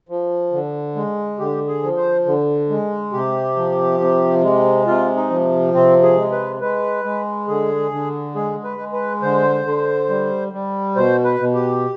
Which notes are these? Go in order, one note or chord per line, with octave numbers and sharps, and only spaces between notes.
F3
D3
G#3
D3 G4
G#4
F3
C5
D3
G#3
C3 G4
F3
C3
G#3
C3 F4
D#4
F3
C3 C4
G#4
G#3
B4
G#3 B4
G#3
D3 G#4
D3
G#3 G#4
B4
G#3
B4
D3 C5
D3
G3
G3
B2 C5
B4
B2
G4